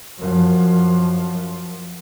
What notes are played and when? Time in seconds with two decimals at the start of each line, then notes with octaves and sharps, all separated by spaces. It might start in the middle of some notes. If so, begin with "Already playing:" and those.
0.19 F#2 F3